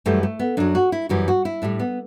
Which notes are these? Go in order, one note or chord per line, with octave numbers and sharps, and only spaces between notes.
F#2 E3 G3 A3
A3
B3
F#2 F#3 D4
F#4
E4
F#2 E3 G3 F#4
F#4
E4
A2 G3 D4
B3